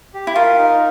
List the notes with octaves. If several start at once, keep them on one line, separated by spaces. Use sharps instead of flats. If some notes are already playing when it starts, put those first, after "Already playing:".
G4
E4
F4 A#4
D#4